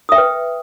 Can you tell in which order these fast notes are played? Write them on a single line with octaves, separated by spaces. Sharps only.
D#6 E5 G5 B4